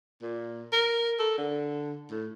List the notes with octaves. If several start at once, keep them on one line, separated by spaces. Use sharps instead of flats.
A#2
A#4
A4
D3
A2